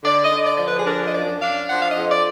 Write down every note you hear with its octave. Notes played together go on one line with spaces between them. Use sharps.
D3 D5
D#5
D3
D5
F3 D5
B4
G#4
D4 A#4
D#5
F#2 D5
D4 F5
F3 F#5
F5
D#5
F2
D5